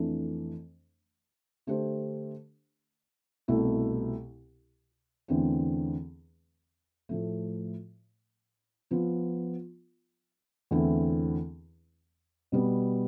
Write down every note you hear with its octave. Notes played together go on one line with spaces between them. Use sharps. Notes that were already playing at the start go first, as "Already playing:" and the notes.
Already playing: F2 E3 A3 D4
D3 A3 D4 G4 C5
C2 B2 A3 E4
E2 D3 A3 C4
A2 F3 A3
F3 B3 F4
E2 D3 A3 C4 E4
B2 G3 B3